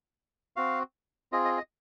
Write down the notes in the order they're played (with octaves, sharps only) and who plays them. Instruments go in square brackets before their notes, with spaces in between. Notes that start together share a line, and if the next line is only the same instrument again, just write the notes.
[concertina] C4 F#4 F5
C4 F4 G#4 D#5
D#5
D#5